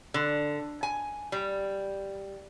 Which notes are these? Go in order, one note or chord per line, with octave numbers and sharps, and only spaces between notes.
D3
G#5
G3